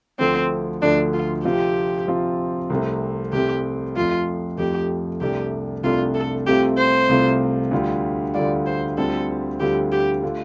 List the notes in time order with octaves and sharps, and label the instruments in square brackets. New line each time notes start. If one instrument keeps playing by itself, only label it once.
[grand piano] D2 D3 F3 A3 [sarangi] C4
[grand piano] D2 D3 F3 A3 [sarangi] D4
[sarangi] F4
[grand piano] C3 F3 C4 F4 [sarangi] G4
[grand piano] C3 F3 C4 F4
C2 C3 A3 C4
[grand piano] C2 C3 A3 C4 [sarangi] G4
[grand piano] F2 F3 A3 [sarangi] F4
[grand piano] F2 F3 A3 [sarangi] G4
[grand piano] C2 C3 A3 D4 [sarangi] G4
[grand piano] C2 C3 A3 D4 [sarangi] F4
[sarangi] A4
[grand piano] C2 C3 A3 C4 F4 [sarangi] G4
[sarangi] C5
[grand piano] C2 C3 A3 C4 F4
D2 D3 G3 F4
[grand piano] D2 D3 G3 F4 [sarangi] D5
[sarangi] C5
[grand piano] D2 D3 G3 C4 F4 [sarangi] A4
[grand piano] D2 D3 G3 C4 F4 [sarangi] G4
[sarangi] G4
[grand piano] D3 A3 F4